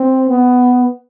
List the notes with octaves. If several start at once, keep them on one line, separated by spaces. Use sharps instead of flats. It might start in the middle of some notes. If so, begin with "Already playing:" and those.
Already playing: C4
B3